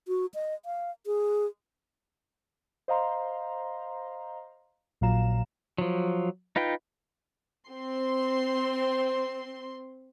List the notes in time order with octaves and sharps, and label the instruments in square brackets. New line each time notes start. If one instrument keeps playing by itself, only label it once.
[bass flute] F#4
D#5
F5
G#4
[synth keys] C5 D#5 F5 A#5 C6
A#1 A#2 F#3 F5 A#5 E7
[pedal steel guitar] F3 F#3
D#4 F4 B4 G5
[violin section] C4 C6